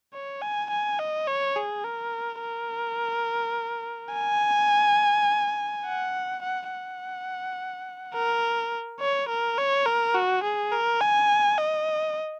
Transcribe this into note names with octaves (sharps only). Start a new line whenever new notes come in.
C#5
G#5
G#5
D#5
C#5
G#4
A#4
A#4
G#5
F#5
F#5
F#5
A#4
C#5
A#4
C#5
A#4
F#4
G#4
A#4
G#5
D#5